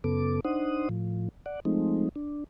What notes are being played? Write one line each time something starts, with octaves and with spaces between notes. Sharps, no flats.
F#2 C#3 B3 A4 D6
D4 D#4 C5 F#5 D#6
A2 F3
D5 F#5
F3 G#3 A3 C4 D#4
D4